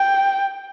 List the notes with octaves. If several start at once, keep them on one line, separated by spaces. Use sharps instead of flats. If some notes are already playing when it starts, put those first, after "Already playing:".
Already playing: G5